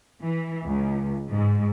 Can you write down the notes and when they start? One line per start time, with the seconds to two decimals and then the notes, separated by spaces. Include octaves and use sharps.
0.21 E3
0.66 C#2
1.30 G#2